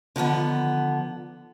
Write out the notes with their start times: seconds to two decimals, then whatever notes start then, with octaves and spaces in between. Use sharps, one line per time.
0.16 D3 D#3 F3 B3